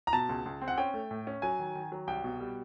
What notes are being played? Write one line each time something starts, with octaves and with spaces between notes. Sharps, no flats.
A#5
B2 A5
C#2
C#2
C4
F#5
C#4 G5
A3
A2
C#4
F#3 G#5
D#3
D#3
F#3
C2 G5
B2
G3